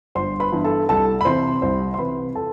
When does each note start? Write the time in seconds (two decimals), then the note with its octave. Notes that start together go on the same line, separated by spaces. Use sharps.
0.15 G1 C5 C6
0.40 B4 B5
0.52 G2 E3 B3
0.64 A4 A5
0.89 C2 A4 A5
1.21 B5
1.25 C3 E3 C5 C6
1.62 C2 C5 C6
1.94 C6
1.99 C3 E3 B4 B5
2.35 A4 A5